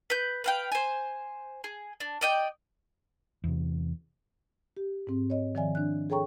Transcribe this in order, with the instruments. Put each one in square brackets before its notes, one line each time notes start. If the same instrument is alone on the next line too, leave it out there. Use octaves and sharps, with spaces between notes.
[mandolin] B4 G6
B4 F5 G5
C5 G#5
G#4
D4
D5 D#5 G5
[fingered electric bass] E2 C3
[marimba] G4
G#2 C4
C#5 D#5
D#3 F3 D5 E5 G#5
D4 F#6
G#4 A4 C#5 G5 A#5 C#6